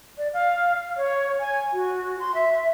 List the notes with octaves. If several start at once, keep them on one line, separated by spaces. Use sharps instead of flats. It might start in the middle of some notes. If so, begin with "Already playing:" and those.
D5
F5
C#5
G#5
F#4
C6
E5